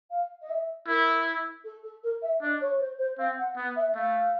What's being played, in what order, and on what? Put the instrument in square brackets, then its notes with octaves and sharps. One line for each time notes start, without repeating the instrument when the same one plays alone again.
[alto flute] F5
D#5
E5
[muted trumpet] E4 [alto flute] A#4
[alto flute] A4
A4
A#4
E5
[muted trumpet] D4 [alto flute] D#5
[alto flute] C#5
C5
C5
[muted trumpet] C4 [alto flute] F5
[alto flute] F#5
[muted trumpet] B3
[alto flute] E5
[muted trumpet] A3 [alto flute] F5